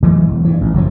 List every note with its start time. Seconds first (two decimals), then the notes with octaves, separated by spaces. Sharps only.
0.03 E3 F#3 G#3 A3
0.28 E1
0.45 G2 E3
0.61 A1
0.74 F#1 F#2 C#3 F3